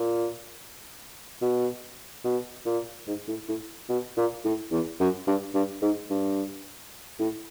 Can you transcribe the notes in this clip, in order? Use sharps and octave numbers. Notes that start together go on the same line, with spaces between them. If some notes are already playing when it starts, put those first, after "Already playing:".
Already playing: A#2
B2
B2
A#2
G#2
A2
A2
B2
A#2
A2
E2
F#2
G2
G2
G#2
G2
A2